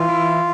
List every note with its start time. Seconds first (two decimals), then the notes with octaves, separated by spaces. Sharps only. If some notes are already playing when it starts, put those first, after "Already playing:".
Already playing: E3 F4
0.09 E4